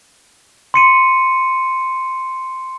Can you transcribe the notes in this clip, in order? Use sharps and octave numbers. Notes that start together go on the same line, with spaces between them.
C6 C#7 D#7